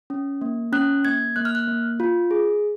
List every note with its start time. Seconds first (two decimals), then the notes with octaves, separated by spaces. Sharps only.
0.10 C#4
0.41 A#3
0.73 C#4 F#6
1.05 A#3 G#6
1.36 A#3 F#6
1.45 F6
1.55 F#6
1.67 A#3
2.00 F4
2.31 G#4